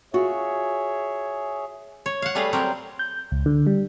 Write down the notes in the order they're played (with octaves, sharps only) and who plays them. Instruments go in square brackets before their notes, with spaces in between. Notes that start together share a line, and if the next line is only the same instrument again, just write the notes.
[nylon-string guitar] F4 F#4 [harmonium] G#4 C#5 E5
[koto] C#5
F5 F#5
G3 A3 G#4 B4 F5
F#3 G3 C4 A#4
[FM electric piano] G6
C#2
D3
G3